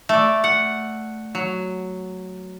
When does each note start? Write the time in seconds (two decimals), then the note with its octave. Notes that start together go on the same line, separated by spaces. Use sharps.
0.09 A3 D5
0.44 F#5
1.35 F#3